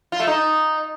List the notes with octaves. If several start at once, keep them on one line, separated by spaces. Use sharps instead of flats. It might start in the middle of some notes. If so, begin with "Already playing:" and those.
F4
A3
D#4